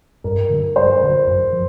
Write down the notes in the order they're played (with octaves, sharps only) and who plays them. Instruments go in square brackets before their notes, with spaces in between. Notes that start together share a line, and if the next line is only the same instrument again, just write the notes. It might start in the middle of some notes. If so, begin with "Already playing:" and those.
[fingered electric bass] G2 [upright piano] A#4
[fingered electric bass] D3 F#3
[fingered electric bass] G2 [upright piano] C5
[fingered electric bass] D3 F#3
F#2
F3